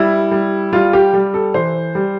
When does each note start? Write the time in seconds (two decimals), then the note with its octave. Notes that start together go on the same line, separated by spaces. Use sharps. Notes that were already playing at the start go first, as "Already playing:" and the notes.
Already playing: G3 E4
0.31 G3
0.73 G3 F4
0.93 G4
1.14 G3
1.34 A4
1.54 E3 C5
1.95 G3